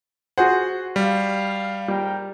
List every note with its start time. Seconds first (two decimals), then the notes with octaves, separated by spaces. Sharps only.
0.38 F#4 G#4 C5 F#5
0.96 G3 F5
1.88 G#2 G3 A#4 G5